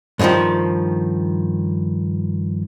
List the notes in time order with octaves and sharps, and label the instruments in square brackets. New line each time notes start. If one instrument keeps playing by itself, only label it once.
[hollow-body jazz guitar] G2 A#2 D3 D#3 F3